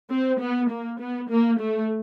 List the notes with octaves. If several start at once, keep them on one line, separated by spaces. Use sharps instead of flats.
C4
B3
A#3
B3
A#3
A3